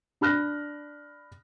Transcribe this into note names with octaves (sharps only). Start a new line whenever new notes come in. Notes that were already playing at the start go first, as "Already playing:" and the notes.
D4 B5 F6 F#6 A#6